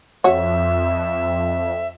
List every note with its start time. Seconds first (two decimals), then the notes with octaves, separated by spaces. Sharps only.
0.24 F2 F#4 C#5 E5